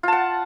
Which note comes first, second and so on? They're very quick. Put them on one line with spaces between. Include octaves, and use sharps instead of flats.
F4 A5 F#5